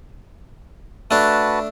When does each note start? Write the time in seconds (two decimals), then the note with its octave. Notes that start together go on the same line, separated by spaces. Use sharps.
1.11 A3 D4 F#4 B4 A5